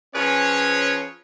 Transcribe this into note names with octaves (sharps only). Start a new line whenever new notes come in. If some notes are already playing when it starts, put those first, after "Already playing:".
F3 C#4 G#4 B4 C#5